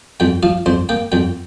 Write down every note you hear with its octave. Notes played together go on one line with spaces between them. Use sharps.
F2 G5
F3 F5
F2 C5
A#3 G5
F2 G5